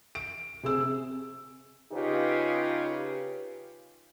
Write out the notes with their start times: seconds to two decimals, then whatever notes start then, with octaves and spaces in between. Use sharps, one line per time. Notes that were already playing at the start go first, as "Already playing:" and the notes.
0.15 D7
0.63 C3 G#4 E6
1.92 C#3 D#4 F4 G4 B4